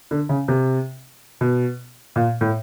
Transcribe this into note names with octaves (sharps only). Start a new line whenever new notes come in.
D3
C#3
C3
B2
A#2
A2